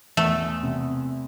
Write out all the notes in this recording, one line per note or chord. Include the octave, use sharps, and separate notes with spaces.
E2 A3
C3